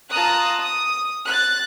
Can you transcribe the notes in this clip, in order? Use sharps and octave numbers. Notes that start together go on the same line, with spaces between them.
F4 A5 A#5 D#6 F#6
D#6
F#6 A6